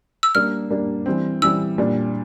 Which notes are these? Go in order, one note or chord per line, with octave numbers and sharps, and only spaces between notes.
E6
G3 A#3 D4 F6
G3 A#3 D4
E3 G3 C4
E3 G3 C4 E6
A#2 G3 D4